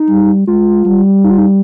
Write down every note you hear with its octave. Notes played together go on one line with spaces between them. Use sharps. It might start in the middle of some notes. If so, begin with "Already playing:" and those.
Already playing: D#4
G3
G#3 F4
G3
D#4
F4
D#4